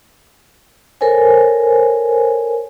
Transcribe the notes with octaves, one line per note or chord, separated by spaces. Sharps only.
A4 A#4 C5 C#5 G#5